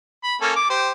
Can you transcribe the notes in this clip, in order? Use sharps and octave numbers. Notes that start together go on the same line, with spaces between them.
B5
A#3 C#4 A4
D6
G4 C5